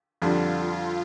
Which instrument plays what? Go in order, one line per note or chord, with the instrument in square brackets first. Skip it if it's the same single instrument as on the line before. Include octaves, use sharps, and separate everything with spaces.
[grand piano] F2 D3 G3 [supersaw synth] F4